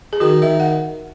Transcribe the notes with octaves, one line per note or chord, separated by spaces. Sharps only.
G#4
D#3 F#4
D#3 E5
F#5